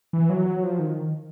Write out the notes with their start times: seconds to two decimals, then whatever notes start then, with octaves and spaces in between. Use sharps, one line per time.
0.13 E3
0.30 F#3
0.46 F#3
0.63 F3
0.79 D#3